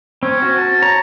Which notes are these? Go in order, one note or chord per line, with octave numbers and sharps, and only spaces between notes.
C4 C#4
F#4
A5
C#5 A#5